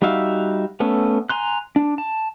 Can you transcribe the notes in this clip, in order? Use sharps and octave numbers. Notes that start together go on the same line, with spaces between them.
G3 D#4 F#4 E5 F5
A3 B3 C#4 A4
G#5 A#5 C6 F#6
D4
A5